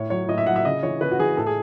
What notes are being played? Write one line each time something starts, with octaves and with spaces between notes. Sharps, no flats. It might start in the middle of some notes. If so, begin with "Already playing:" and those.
Already playing: A2 C#5
F#3 C#5
A2 D#5
E5
F#3 F#5
E5
C#3 D#5
E3 C#5
C#3 B4
F#4
E3 G#4
A2 A4
G#4